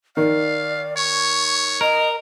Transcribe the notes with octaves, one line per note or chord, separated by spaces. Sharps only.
D#3 D5 F5
C#5 C#6
A#4 D#5